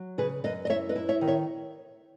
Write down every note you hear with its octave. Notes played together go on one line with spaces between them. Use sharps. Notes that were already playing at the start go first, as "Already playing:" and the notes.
Already playing: F#3
C#3 G#4 B4
F#2 B4 D#5
D#5
E4 C#5 E5
B4 D#5
E4
C#5 E5
D#3
C#5 E5